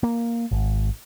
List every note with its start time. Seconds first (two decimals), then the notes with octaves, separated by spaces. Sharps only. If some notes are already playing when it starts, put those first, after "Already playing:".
0.03 A#3
0.51 G#1